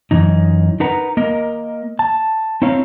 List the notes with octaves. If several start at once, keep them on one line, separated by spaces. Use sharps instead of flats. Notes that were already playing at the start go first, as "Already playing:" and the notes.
F#2 E3 D#4
D#4 A#4 B4 F#5 A#5
A#3 A#4 D#5
A5
C4 D#4 E4 C#5 F5